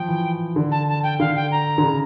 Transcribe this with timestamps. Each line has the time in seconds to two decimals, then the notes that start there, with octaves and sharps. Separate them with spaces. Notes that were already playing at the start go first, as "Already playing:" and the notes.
Already playing: F3 G5
0.08 E3
0.56 D3
0.72 A5
0.88 A5
1.03 G5
1.20 D3 F5
1.36 G5
1.51 A#5
1.78 D3
1.83 C#3